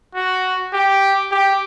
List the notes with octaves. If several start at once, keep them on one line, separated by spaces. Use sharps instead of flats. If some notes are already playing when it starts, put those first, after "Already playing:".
F#4
G4
G4